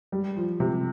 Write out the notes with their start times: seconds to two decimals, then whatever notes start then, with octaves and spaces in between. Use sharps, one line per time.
0.12 G3
0.36 F3
0.60 C3